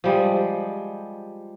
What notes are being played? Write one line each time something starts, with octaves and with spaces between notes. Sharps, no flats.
F3 G3 G#3